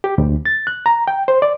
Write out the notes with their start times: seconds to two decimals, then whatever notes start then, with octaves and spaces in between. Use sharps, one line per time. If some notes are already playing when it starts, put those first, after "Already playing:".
0.04 G4
0.18 D2
0.46 A6
0.67 F#6
0.86 A#5
1.08 G5
1.28 C5
1.42 D5